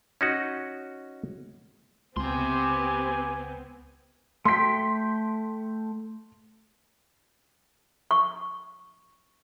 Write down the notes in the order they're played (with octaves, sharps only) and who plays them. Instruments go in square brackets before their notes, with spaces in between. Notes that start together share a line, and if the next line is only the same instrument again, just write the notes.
[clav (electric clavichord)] C#4 D#4 F#4
[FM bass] C#2 [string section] B3 C4 [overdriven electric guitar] G4 C6 [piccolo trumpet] G#5
[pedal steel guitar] A3 G5 [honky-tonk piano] C6 B6
[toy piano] C#6